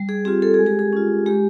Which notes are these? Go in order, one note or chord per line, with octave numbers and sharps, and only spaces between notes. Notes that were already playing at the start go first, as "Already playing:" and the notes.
Already playing: G3
G#4
C4 F4 G4
A4
G#3 G#4
G4
G#4
C#4 F4
G#3 G4